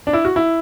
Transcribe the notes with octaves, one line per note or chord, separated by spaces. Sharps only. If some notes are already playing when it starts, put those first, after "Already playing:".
D4
E4
F#4
E4